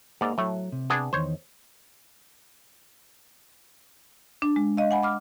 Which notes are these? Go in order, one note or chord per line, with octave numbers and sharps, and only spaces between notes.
G#2 A#3 D5
A2 F#3 A3
C3
B3 D4 G#4
E2 D#3 C5 C#5
D4
G#3
D#5 F5
F#5 G#5 B5
B5 D6 F6